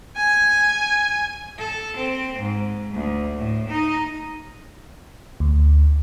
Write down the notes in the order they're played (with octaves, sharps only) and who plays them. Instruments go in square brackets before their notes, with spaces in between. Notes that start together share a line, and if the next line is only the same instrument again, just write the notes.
[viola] G#5
[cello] A4
C4
G#2
D2
A2
D#4
[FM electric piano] D2